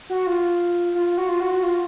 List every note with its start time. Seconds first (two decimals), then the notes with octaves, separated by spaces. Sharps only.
0.10 F#4
0.27 F4
0.95 F4
1.06 F4
1.18 F#4
1.29 F4
1.40 F#4
1.52 F#4
1.63 F4